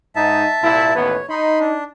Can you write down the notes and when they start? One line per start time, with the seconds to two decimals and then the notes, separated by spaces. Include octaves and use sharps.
0.16 G#2 D#4 E5 A5
0.62 C2 A#2 E4
0.95 A1 D#2 B3 C#5
1.30 D#4 B5 C6
1.59 D4